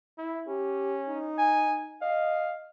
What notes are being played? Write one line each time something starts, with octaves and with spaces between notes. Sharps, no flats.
E4
C#4 G4
D#4
G#5
D#5 F5